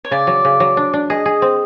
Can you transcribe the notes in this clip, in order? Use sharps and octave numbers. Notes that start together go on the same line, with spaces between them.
C#5
C#3 D5
F#3
C#3
F#3
D4
D4
G#4 D#5
G#4
C4